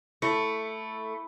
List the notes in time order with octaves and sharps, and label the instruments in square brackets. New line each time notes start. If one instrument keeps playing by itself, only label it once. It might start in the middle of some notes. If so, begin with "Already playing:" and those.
[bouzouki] A3 [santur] E4 [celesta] C#7